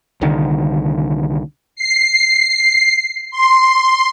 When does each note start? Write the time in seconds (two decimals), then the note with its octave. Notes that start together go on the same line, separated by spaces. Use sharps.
0.21 C2 D3 D#3
1.76 C7
3.31 C6